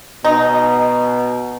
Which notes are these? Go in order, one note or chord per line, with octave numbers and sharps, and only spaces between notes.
B2 D#4